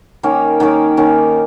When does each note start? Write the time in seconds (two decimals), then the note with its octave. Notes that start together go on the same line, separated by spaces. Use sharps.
0.23 D#3 A#3 C#4 A#4
0.60 D#3 A#3 C#4 A#4
0.97 D#3 A#3 C#4 A#4